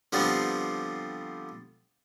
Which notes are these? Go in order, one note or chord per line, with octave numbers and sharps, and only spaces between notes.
D3 F3 G3 B3 C4